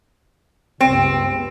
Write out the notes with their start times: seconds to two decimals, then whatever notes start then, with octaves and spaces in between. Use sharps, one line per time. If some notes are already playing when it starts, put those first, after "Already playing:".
0.81 C#2 G2 B3 C4